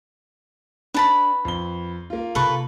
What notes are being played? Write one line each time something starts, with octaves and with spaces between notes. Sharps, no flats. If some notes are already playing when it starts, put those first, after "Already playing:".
D4 B4 A5 B5
F2 G7
A#3 F4
C3 D#4 A4 B4 C#6